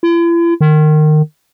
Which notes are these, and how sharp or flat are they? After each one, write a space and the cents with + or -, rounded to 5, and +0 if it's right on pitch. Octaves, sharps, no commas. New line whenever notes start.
E4 +45
D#3 -25